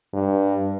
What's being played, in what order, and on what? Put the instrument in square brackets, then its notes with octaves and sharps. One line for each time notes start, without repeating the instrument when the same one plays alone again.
[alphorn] G2